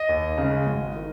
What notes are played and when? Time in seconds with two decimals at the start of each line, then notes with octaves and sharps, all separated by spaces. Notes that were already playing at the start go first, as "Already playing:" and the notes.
Already playing: D#5
0.09 D#2
0.38 C#3
0.43 G#3
0.67 G#1
0.96 D#3